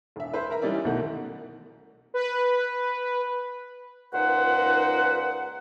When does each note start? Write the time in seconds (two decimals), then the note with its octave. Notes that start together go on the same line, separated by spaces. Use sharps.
0.16 E1 E5
0.33 B4 C5 E5
0.50 A#4 E5 A#5
0.62 E3 G3 C#4 D#4 D5 E5
0.85 B1 B2 D#3 A3 F#5
2.14 B4
4.13 C#2 A#2 D#4 B4 C5 F#5